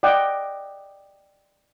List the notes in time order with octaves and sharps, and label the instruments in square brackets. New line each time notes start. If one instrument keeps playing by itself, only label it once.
[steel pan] D5 D#5 F#5 G5